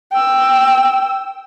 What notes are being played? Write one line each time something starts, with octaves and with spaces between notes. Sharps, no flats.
G5 E6